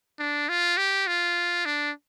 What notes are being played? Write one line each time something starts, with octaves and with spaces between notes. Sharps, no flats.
D4
F4
G4
F4
D4